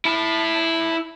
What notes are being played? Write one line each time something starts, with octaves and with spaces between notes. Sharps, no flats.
E4 A5